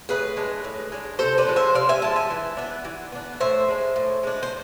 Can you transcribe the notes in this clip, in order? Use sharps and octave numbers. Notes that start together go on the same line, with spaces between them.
A2 G#4 B4
G#3 D4
A2
G#3 D4
C3 A4 C5
B4 D5
F3 G#3 D4
C5 E5
C3 D5 F5
E5 G#5
F3 G#3 A5
E5 G#5
E3
B3 D4
E3
B3 D4
A2 C5 E5
G#3 D4
A2
G#3 D4
C5